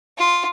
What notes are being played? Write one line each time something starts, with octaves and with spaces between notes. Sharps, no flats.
F4